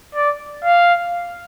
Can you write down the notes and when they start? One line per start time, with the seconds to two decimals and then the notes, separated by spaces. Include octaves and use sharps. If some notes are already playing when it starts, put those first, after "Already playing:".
0.15 D5
0.64 F5